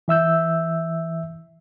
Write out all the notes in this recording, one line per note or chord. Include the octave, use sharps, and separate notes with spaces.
E3 E5 E6 G6